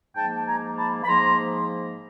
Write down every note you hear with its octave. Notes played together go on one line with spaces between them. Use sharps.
G#2 F3 A#3 G5 A5
A5
G#5 A#5
A5 B5
B5
G#2 F3 A#3 A#5 C6